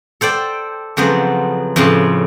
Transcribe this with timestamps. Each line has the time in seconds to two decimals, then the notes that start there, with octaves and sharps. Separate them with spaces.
0.21 A4 C5 D5 G5
0.97 F2 C#3 F#3 B3 C5
1.76 F2 A2 C#3 A5 C6